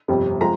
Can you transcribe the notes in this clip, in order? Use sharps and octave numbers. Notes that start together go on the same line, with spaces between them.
G1 F2 C3 G3
F3 G#3 A#5